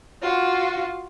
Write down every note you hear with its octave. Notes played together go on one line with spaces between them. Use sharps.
F4 F#4